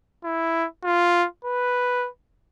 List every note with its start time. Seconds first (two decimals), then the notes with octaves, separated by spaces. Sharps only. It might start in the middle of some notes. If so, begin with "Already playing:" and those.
0.24 E4
0.84 F4
1.45 B4